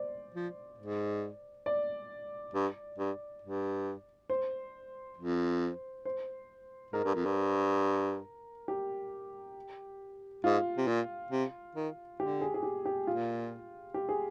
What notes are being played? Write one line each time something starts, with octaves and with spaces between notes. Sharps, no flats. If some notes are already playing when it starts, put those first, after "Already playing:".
Already playing: C5 D5
F3
G#2
D5
G2
G2
G2
C5
F2
C5
G#2 A#4
G2
F2
G2
G4
G#2 F4
C3
A#2
C3
D#3
D3 G4
G#4
G#4
G4
G4
A#2 F4
G4
G#4